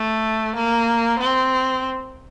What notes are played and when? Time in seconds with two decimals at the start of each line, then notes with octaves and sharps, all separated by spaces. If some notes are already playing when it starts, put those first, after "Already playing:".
Already playing: A3
0.56 A#3
1.20 C4